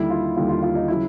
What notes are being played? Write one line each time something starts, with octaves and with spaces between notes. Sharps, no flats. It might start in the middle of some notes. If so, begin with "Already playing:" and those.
Already playing: D#2 D3 G3 E4
F4
D#2 D3 G3 F4
F4
F4
D#4
C#3 F#3 E4